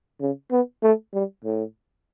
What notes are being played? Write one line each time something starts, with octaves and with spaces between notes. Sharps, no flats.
C#3
B3
A3
G3
A2